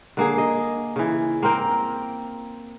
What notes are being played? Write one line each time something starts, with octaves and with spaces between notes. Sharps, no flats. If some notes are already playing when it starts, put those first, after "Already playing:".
D3 A#3 G#4
D#5
C#3 E3
A#3 C4 A#4 G5